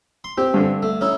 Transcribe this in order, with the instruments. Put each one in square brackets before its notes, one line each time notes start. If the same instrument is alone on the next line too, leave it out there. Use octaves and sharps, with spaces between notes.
[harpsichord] C6
[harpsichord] C4 [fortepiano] G4
[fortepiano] G2 D3
[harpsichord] A3
C#4 D#4 E4